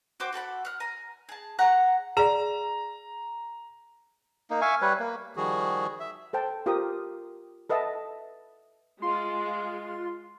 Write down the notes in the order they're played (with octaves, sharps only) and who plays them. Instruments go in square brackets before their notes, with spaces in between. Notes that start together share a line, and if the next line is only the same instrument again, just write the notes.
[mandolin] F#4 C5 G5 D6
F#4 A4 F#5 B5
F#5 F6
G#5 A#5
G#4 A5
G#4 C#5 F#5 A#5
[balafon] G#4 D5 [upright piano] A#5
[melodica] A#3 D#4
E5 F5 G#5 C#6
G3 B4 C#5
A#3
[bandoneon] D#3 F3 G3 F#4 G#4
E5
[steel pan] A4 C5 G5 A5
F4 G4 A#4 C5 D#6
A4 B4 D#5 E5 F#5 A5
[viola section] G#3 [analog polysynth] F4 [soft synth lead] C6